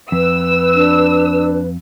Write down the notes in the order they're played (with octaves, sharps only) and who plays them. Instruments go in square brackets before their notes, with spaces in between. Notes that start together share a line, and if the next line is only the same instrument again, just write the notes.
[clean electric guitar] F2 [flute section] B4 [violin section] E6
[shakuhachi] D4